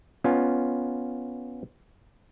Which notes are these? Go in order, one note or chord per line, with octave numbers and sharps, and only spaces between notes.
B3 C#4 F4